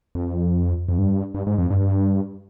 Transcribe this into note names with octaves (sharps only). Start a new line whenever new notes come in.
F2
F2
G2
G2
G#2
F2
G2